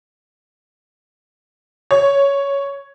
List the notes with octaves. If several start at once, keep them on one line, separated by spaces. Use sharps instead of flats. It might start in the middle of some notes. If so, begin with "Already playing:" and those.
C#5